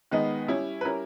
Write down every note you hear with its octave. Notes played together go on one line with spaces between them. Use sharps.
D#3 G#3 B3 D#4
G3 C#4 E4
B4
G3 C#4 E4 A#4